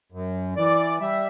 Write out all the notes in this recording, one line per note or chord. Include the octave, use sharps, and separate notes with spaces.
F#2
E3 D5
G3 E5